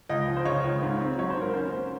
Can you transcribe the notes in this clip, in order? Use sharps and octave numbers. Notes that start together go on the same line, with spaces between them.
C#2 D#5
F3
C5
C#3 C#5
C#2
G#2
C4
F#3 C#5
C5
G#2 A#4
C#4 C5
A#3